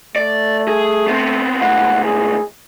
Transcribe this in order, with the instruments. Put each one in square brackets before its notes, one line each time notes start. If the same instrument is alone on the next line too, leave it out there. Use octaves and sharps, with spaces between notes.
[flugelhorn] A3 [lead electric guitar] D5
[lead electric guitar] G#4
B3 C4
[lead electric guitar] C#2 A2 [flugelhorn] F#5
[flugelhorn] G#4